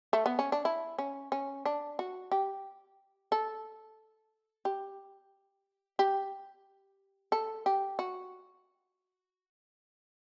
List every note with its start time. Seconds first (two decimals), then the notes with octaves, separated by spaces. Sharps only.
0.13 A3
0.26 B3
0.39 C#4
0.52 D4
0.65 E4
0.98 C#4
1.32 C#4
1.66 D4
1.99 F#4
2.32 G4
3.32 A4
4.65 G4
5.99 G4
7.32 A4
7.66 G4
7.99 F#4